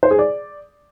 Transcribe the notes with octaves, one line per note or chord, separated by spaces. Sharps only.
C5
G#4
D5